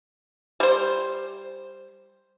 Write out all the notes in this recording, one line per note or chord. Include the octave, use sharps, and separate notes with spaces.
G3 C5